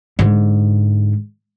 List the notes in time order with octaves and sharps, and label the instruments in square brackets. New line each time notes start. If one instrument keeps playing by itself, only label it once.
[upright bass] G#2 D3